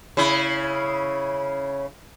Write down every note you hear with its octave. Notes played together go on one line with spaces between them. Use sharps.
C#3 E4